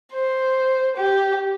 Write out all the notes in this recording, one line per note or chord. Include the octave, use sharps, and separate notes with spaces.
C5
G4